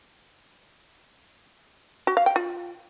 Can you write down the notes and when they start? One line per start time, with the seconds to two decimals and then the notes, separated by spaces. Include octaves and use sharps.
2.07 F#4
2.17 F5
2.26 G5
2.36 F4